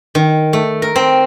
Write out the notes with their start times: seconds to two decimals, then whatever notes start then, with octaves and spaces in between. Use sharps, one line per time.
0.15 D#3
0.53 A3
0.82 A#4
0.96 C4